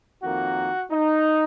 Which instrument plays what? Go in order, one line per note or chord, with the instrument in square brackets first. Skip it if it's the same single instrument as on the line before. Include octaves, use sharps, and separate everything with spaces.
[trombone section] F2 D#3 A#3 F#4
D#4